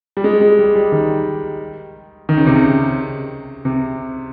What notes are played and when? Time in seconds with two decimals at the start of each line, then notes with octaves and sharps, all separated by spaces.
0.17 G3
0.24 G#3
0.41 G#3
0.59 G3
0.75 G3
0.92 D#3
2.29 D#3
2.38 C#3
2.47 C3
2.55 C#3
3.65 C3